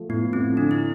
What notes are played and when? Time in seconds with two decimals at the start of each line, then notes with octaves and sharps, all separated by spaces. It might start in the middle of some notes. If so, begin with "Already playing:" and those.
Already playing: F3 A3
0.09 A2 B3
0.33 F3 A3 C4
0.57 D3 D4
0.71 E4